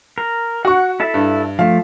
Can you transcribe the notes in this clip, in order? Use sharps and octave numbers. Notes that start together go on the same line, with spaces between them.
A#4
F#4 F#5 C#6
E4 A4 E5
G2
F3 A3 F5